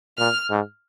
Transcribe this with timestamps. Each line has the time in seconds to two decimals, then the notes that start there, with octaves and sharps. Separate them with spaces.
0.18 A#2 F6
0.50 G#2